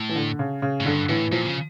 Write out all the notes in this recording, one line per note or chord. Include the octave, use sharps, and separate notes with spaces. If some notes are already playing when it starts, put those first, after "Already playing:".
Already playing: A2
E3
D3
C#3
C#3
A2
G2 D3
A2 E3
A#2 F3
C#3